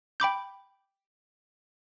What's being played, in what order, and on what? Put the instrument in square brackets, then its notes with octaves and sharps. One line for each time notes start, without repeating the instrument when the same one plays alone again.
[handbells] G5 B5 D6 G6